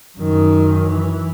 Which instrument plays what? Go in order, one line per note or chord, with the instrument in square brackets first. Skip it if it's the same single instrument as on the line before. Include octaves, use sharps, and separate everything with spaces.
[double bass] F#2 D#3
E3